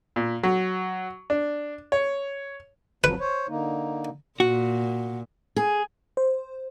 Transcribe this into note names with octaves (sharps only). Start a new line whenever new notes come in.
A#2
F#3
D4
C#5
F2 F3 F#3 B4
C5 C#5
D3 A#3 D#4
A#2 F#4
G#4
C5